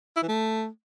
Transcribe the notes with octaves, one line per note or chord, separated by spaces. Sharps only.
E4
E3
A3